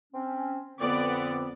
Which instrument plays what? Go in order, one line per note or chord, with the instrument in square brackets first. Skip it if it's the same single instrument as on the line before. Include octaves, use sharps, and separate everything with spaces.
[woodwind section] C4 C#4
[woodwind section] F2 D3 C4 [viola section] B3 D5